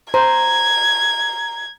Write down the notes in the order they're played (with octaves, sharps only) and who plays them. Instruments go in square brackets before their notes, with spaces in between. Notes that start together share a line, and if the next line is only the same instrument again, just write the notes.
[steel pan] C5 [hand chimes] A#5 [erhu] G#6